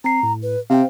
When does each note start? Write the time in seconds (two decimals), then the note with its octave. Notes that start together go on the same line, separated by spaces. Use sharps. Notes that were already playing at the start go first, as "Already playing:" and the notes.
0.04 C4 A#5 C7
0.23 A2
0.43 B4
0.70 C3 C5 F5 G5